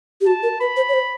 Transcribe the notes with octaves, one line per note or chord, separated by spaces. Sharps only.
G4
F#4 A5
A#4
B4 B5
C5
C#5
C5